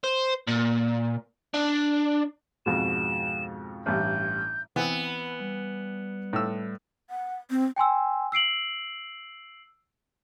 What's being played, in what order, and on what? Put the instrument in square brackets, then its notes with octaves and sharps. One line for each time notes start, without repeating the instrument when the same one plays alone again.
[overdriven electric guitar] C5
A#2
D4
[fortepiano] F2 G#2 B2 [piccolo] E7
[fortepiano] A1 G2 [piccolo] G6
[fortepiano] E3 C4 [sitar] B3
[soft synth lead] B5
G3
[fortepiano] A2 E6
[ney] F#5
C4
[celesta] G5 G#5 C6 E6
E6 C7 D7 F#7